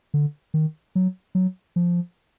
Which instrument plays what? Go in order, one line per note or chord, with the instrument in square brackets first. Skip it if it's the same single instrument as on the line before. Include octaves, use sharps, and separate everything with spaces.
[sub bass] D3
D#3
F#3
F#3
F3